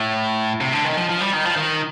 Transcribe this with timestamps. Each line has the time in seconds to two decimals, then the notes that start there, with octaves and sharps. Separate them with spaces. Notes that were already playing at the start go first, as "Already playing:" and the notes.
Already playing: A2
0.61 C3
0.73 D3
0.85 D#3
0.97 F3
1.09 F3
1.20 G3
1.33 D#3
1.45 F3
1.56 D#3